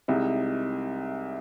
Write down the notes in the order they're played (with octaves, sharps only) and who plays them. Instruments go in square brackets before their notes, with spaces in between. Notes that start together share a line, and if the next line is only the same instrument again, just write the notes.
[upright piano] C2 C3 G#3 D#4